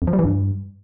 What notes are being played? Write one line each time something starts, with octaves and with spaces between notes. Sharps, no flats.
F2
F3
G3
E3
G2